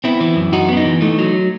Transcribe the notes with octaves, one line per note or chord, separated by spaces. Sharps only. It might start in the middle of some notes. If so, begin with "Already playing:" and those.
B3 C4 E4
E3
F#2
F#2 D#4 F#4
B3 C4
D#4
E3
A3 D#4
F#3